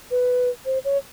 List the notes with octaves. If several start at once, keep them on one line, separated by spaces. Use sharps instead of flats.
B4
C5
C#5